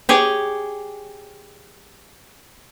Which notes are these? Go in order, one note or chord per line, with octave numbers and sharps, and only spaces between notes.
G4 G#4 C#5